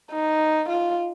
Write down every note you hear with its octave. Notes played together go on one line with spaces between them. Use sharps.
D#4
F4